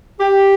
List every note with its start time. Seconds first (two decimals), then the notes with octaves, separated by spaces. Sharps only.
0.21 G4